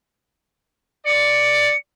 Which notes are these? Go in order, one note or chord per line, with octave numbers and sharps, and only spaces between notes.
D5 C#7